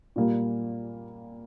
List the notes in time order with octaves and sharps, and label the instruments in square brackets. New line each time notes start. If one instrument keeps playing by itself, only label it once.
[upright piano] A#2 G3 A#3